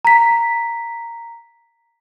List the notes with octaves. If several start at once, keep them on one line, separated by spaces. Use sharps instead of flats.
A#5 B6